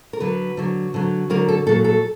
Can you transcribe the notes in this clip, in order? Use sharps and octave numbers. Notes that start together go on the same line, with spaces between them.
A#4
D3 F#3 B4
D3 F#3
D3 F#3
D3 F#3 A#4
A4
A#2 F#3 A4
A4